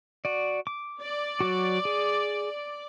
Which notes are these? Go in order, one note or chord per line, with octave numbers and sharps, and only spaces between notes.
F#4 D5
D6
D5
F#3 F#4
G#4